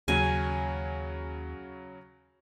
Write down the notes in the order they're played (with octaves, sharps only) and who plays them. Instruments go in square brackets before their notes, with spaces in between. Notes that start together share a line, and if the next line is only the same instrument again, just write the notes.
[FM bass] D#2 [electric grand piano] C#3 F#3 C#4 [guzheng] G#5